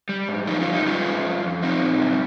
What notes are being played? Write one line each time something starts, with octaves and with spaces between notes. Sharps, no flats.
G3
G#2
F3 D#4 G4
C#4 F4
G2
D#4 G4
G3 C#4 F4
G#2
F2
F2
F3 C4 D#4
A#2
G3